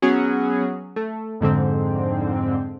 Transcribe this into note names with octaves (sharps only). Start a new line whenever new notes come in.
F#3 B3 C#4 F#4 G#4
A3
F2 G#2 D3 C4